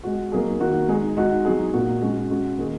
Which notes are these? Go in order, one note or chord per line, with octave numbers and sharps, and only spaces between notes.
G#3 F#4
F#3 A#3 D#4 G#4
D#3 A#3 F#4
G#3 D#4 G#4
G#3 D#4 F#4
F#3 D#4 G#4
A#2 A#3 F#4
G#3 C#4 F#4
G#3 C#4 F#4
D#3 A#3 D#4 G#4